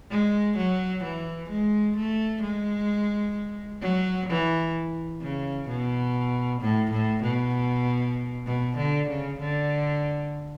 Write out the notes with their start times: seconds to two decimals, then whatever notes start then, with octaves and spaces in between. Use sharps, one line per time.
0.10 G#3
0.57 F#3
1.04 E3
1.49 G#3
1.96 A3
2.42 G#3
3.81 F#3
4.29 E3
5.21 C#3
5.68 B2
6.61 A2
6.91 A2
7.23 B2
8.46 B2
8.77 D3
9.09 C#3
9.40 D3